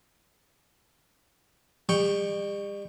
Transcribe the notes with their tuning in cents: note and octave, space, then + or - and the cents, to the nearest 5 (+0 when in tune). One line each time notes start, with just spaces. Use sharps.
G3 +40 G5 +0 C#6 +0